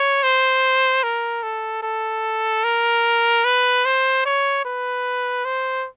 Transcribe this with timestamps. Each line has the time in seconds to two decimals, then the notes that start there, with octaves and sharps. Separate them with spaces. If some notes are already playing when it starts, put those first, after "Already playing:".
Already playing: C#5
0.23 C5
1.03 A#4
1.43 A4
1.83 A4
2.64 A#4
3.45 B4
3.85 C5
4.26 C#5
4.65 B4
5.45 C5